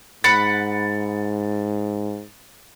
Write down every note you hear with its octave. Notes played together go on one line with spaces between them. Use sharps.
G#2 F#5 B5 A6 C#7